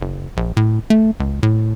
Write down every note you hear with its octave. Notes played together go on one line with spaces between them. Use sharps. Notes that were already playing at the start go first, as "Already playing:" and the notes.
F#1
A#1
A2
A3
C#2
A2